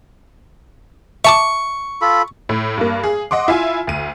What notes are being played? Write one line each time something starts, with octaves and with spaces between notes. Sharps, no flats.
E5 A5 C#6 D6
F4 A4 B5
A2
G2 A#3
G#4
D#5 F#5 C6 D6
E4 F4 E5 G#5
D2 D#7